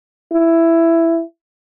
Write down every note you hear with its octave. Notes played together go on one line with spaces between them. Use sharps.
E4